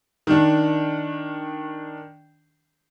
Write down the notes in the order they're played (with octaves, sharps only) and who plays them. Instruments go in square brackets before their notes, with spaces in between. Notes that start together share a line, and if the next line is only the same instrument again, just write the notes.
[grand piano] D#3 D4